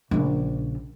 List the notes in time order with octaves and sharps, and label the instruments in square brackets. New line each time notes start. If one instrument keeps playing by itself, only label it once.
[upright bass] A#1 C#3